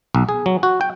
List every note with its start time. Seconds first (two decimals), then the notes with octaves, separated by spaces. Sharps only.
0.15 B1
0.29 G#4
0.46 F#3
0.63 F#4
0.81 G5